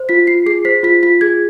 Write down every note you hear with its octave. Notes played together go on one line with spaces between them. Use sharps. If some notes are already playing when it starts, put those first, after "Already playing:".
Already playing: C5
F4 B6
F4 C7
G#4 C7
C5 B6
F4 B6
F4 B6
G#4 G#6